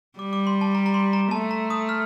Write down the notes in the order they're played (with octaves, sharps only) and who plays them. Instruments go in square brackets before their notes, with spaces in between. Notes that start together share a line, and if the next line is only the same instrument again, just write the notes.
[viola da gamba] G3 [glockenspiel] D6
[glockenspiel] D6
C6
A5
A#5
A#5
C6
A#5
[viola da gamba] A3 [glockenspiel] A5
[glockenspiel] A#5
D#6
F6